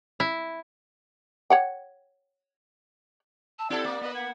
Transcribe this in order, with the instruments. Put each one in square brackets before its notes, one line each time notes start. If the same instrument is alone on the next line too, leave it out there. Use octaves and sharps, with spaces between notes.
[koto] E4
[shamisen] C#5 F#5 G5
[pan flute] A5 [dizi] E6
[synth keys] C4 G4 F#5 [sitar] E4 A4 [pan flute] D5
[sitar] A#3 [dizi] D6
[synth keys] B3 B4 [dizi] D#5
[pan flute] F#5 [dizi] G#6